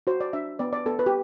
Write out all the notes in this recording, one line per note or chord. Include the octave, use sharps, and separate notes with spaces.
F#4 C5
D5
D4 E5
B3 D5
D5
B3 A4
B4
G4